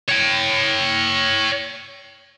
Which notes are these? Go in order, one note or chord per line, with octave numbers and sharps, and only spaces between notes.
C#5 G5